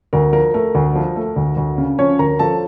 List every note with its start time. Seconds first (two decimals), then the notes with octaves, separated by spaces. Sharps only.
0.13 D2 A#4
0.33 F3 A#4
0.54 A3 A#4
0.75 D2
0.95 F3
1.16 A3
1.36 D2
1.57 D2
1.78 C#3
1.98 F3 C#4 C#5
2.19 D2 A#4 A#5
2.39 F3 A4 A5